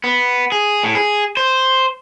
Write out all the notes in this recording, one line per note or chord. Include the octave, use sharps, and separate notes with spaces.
B3
G#4
A2
G#4
C5